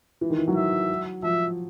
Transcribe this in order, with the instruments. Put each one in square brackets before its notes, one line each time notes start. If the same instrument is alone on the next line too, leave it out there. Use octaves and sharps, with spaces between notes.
[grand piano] E3
D#3
E3
F#3
[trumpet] E5
[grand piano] F3 [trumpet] E5